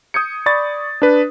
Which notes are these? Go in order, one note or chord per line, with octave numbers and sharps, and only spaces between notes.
D#6 G6 G#6 C#7
D5 B5 C#6 A6
D4 B4